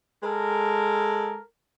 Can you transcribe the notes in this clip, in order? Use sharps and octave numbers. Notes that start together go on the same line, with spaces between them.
G#3 A4 A#4